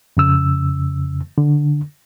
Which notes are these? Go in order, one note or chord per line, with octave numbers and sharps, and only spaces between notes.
F2 C#3 E6
D3